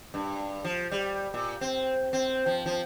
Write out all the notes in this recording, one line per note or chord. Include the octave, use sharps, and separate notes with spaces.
G2
F3
G3
A#2
C4
C4
F3
F3